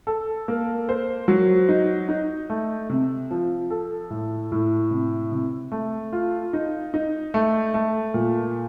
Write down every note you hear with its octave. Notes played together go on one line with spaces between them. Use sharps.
A4
A#3
C5
F#3
D#4
D#4
A3
C3
F3
A4
A2
A2
C3
C3
A3
F4
D#4
D#4
A3
A3
A#2